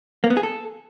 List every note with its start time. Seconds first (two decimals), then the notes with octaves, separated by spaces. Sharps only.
0.24 A#3
0.30 B3
0.37 G#4
0.43 A4